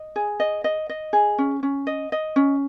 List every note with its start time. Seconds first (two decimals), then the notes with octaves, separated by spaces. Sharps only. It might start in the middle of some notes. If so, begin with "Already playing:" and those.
Already playing: D#5
0.16 G#4
0.40 D#5
0.64 D#5
0.89 D#5
1.13 G#4
1.38 C#4
1.63 C#4
1.87 D#5
2.12 D#5
2.36 C#4